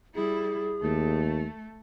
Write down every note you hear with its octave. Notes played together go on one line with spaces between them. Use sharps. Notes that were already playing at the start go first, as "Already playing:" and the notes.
G3 E4 G#4
D#2 A3